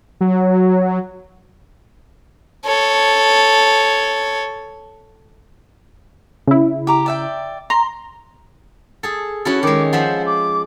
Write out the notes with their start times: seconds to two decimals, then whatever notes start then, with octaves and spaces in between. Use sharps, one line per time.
0.21 F#3
2.65 A4 C#5
6.47 C#3 E4
6.87 G4 A#5 D6
7.06 D5 E5 G5
7.70 A#5 C6
9.03 G#4 A4
9.45 C#4 E4 F#4 A4
9.63 D#3 G#3 D6
9.93 F3 C5 E5 F#5
10.26 D6